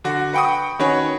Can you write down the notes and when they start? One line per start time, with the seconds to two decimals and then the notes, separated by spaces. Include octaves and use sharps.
0.04 D3 F#4
0.33 B4 F#5 G5 C#6 D#6
0.79 D#3 C#4 F#4 B4 C#5